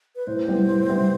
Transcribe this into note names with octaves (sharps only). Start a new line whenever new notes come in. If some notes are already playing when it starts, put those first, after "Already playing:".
B4
A2 C5
G3 B3 E4
A2
G3 B3 E4